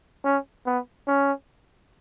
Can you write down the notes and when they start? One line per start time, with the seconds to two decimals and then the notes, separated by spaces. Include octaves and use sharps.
0.25 C#4
0.66 B3
1.07 C#4